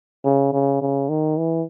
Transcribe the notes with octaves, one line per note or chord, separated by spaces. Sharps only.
C#3
C#3
C#3
D#3
E3